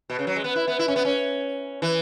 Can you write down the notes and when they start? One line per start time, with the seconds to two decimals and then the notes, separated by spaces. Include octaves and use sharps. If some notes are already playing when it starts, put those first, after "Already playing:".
0.10 B2
0.19 C#3
0.27 F#3
0.36 G#3
0.44 B3
0.56 E4
0.68 B3
0.79 E4
0.88 C#4
0.96 B3
1.05 C#4
1.82 E3